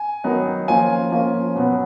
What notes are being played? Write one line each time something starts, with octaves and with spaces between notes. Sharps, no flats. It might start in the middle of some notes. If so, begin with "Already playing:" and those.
Already playing: G#5
D#3 F#3 B3 D#4
F3 A#3 C#4 F4 G#5
F3 A#3 C#4 F4
B2 F#3 B3